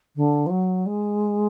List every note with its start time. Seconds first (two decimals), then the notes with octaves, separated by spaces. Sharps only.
0.15 D3
0.46 F3
0.50 F#3
0.86 G#3